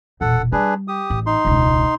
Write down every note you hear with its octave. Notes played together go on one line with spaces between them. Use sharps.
E1 A#2 A4 F#5
G3 D4 G#4 B4
G4 D#6
A1
D#4 C6
E1 C#2